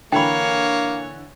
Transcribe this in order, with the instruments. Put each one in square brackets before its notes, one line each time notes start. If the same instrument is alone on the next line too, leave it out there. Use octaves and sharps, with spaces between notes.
[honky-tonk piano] D3 E3 [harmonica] A#3 [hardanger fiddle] C#5 [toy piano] G5 B5